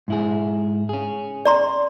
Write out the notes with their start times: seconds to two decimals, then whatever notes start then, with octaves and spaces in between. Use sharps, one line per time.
0.08 G#2 E4 G#4
0.89 C#4 G#4
1.45 D5 A#5 C6